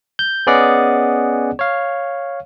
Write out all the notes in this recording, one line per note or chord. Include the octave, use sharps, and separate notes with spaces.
G6
B3 C#4 G#4 D5 D#5 F#5
C#5 F5